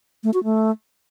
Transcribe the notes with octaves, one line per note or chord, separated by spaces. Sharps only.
A3
F#4
A3